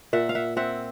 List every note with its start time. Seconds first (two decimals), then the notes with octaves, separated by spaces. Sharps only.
0.13 A#2 E5 F#5
0.29 F5
0.35 E5 F#5
0.57 C4 E5 F#5